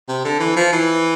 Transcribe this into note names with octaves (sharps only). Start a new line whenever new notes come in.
C3
D3
E3
F3
E3